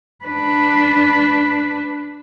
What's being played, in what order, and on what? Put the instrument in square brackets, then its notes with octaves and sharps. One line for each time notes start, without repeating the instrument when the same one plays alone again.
[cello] D4 B4